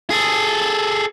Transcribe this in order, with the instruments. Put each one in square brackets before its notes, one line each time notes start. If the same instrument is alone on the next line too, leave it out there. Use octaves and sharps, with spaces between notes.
[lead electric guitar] G#4 A4